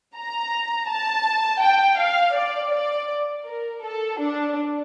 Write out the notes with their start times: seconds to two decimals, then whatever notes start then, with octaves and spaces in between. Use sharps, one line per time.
0.16 A#5
0.89 A5
1.62 G5
1.99 F5
2.36 D5
2.72 D5
3.46 A#4
3.83 A4
4.18 D4